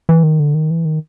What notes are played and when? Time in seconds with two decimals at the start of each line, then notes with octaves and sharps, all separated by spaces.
0.09 E3
0.23 D#3
0.40 D3
0.54 D#3
0.70 E3
0.85 D#3